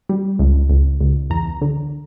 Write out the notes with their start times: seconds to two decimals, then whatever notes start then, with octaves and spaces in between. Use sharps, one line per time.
0.09 G3
0.39 C#2
0.70 C#2
1.01 C#2
1.30 E2 A#5
1.62 D3